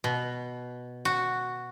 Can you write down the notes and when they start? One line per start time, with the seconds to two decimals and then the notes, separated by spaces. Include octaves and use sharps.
0.04 B2
1.05 F#4